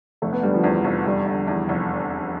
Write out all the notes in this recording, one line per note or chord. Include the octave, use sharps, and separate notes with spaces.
F1 A3
B3
D3 G3
F3
E2
F1
F1 G3
D3
E2
F1